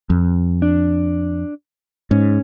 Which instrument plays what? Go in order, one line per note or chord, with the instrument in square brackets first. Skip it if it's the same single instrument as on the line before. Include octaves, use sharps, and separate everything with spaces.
[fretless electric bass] F2
[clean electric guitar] D4
[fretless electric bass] G#2 [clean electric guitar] C#4